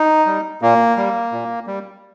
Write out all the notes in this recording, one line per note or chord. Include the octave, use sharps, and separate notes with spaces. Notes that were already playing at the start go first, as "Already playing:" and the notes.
Already playing: D#4
G3
A#2 A#3
G3
A#2
G3